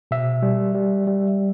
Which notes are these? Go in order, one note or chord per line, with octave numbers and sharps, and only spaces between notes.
B2 E5
G3
G3
G3